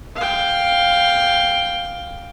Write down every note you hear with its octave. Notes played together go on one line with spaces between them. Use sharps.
F5 G5